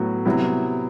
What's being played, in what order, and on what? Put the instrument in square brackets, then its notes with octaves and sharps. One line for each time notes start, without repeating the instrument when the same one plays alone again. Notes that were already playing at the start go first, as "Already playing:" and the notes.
Already playing: [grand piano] A2 F#3 B3 F#4
C3 F#3 B3 E4